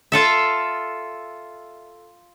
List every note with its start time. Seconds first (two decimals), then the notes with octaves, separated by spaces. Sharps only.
0.12 F4 A4 E5